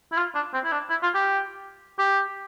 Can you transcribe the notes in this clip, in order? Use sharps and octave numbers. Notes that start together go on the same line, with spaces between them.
E4
F4
D4
C4
E4
D4
E4
F4
G4
G4